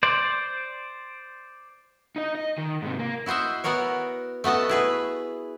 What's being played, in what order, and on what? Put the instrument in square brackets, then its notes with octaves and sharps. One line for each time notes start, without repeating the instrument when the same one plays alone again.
[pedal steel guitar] C5 D5
[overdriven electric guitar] D#4 D#5
D#5
D#3
G#2 C3
A#3
[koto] E4 F#4 C5 D#5 E5
B3 E4 F#4 A#4 C#5
A3 B3 F#4 D#5 A5
E4 G#4 B4